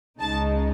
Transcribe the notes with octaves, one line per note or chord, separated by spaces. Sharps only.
C#2 C#3 G#3 D#4 A5